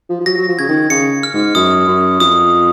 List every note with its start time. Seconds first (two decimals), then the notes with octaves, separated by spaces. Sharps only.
0.10 F3
0.20 F3
0.26 F#3 A#6
0.37 F#3
0.48 F3
0.59 C#3 G#6
0.69 D#3
0.90 C#3 C#7
1.23 F6
1.34 G#2
1.55 F#2 D#6
1.88 F#2
2.20 F2 D#6